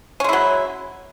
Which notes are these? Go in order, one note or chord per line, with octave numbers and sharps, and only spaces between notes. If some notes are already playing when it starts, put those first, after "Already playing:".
F#3 G#3 C#4 E4